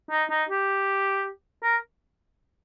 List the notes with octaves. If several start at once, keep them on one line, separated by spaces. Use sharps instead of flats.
D#4
D#4
G4
A#4